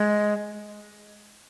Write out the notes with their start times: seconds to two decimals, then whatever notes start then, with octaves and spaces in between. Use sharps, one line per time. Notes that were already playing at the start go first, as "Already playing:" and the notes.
Already playing: G#3